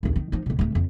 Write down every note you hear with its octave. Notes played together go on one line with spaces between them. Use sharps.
A#1 D#2
D#3
F3 D#4
D2 B2
D1 A3
F2